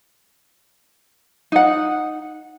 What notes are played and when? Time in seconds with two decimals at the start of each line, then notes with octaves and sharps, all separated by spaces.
1.52 D#4 F#5